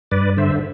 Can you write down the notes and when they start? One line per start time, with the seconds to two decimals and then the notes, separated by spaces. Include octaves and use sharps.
0.11 G2 B4 D5
0.37 D3 C5 E5